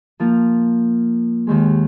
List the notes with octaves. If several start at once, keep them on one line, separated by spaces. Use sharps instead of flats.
F3 A#3 F4
D#2 D#3 G#3